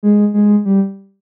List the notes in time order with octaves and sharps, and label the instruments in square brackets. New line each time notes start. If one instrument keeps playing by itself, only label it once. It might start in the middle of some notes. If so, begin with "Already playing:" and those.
[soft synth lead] G#3
G#3
G3